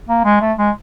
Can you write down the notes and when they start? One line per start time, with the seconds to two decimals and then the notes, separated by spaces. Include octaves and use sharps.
0.09 A#3
0.25 G#3
0.41 A3
0.59 G#3